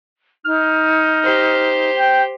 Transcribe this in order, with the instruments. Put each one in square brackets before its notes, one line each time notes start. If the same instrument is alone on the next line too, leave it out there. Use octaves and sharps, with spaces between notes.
[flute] D#4 [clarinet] F6
[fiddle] G4 C5
[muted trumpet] G5